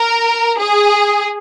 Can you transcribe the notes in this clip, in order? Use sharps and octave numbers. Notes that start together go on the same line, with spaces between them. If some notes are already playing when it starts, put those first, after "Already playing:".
Already playing: A#4
G#4